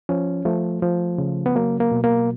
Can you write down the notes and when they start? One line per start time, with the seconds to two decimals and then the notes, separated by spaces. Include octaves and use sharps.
0.09 F3 C#4
0.45 F3 A3
0.82 F3
1.18 C#3
1.46 B3
1.55 F#3 A#3
1.80 A#3
1.92 B2
2.04 A#3